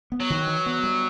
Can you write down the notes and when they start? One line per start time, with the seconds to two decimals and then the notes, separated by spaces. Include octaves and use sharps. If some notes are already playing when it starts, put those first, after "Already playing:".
0.12 B3
0.20 F#3
0.30 D#3
0.47 E3
0.66 B3
0.84 G3